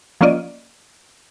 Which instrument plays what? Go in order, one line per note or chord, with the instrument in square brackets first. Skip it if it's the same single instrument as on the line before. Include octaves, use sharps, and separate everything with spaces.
[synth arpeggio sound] F3 A#3 C#4 F4 D5 D#5